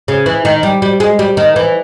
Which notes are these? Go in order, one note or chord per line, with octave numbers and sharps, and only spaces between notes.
C#3
E3
D#3
G3
G3
G#3
G3
D#3
E3